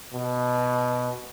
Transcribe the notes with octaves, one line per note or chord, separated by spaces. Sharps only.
B2